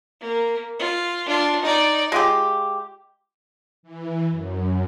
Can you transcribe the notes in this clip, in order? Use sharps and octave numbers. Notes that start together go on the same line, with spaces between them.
A#3
F4
D4 F4
D#4 D5
G#3 F4 G4
E3
F#2